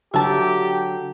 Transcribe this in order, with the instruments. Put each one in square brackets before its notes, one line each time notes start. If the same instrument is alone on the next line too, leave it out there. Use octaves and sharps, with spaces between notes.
[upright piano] D3 F#3 [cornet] G4 [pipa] E5 A5